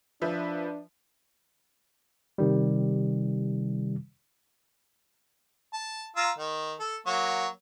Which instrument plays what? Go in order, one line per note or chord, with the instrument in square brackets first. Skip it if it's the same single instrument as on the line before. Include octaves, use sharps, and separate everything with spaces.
[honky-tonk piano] F3 B4 E5 [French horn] D4
[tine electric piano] C3 D#3 G3
[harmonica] A5
F4 A#5 E6
D#3
A4
F#3 A#3 C#6